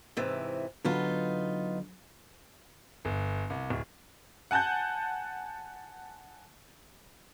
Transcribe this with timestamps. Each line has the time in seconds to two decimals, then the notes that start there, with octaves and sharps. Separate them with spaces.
0.17 G#2 C3 E3
0.85 D3 F#3 B3 D#4 F4
3.05 G1
3.50 C2
3.70 D1
4.51 F#5 G#5 A5 F#6 G6